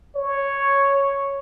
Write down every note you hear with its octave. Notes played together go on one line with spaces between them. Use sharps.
C#5